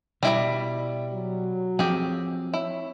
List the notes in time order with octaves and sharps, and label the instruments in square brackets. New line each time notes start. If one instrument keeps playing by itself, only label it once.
[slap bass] B2 [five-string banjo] G3 E4 D5
[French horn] F#3
[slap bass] F3 C4 [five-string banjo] G4 G#4
[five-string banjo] E4 [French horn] C#5